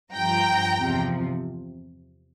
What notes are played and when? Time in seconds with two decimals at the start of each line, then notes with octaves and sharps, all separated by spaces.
0.14 G2 F3 G5 A#5
0.76 E2 C3 F3